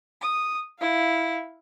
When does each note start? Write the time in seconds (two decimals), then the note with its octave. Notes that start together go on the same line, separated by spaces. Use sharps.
0.21 D#6
0.79 E4 F5